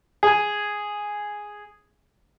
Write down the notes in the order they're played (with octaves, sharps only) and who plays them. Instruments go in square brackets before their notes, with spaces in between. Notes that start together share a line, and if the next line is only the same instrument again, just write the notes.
[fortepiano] G#4 G#5